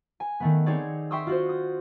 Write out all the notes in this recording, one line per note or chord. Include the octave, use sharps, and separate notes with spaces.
G#5
D#3 A3 B3
C4 D#4 G#4 C#5 D5
E5 G5 C6 C#6 D#6 E6
F4 F#4 C5
D#6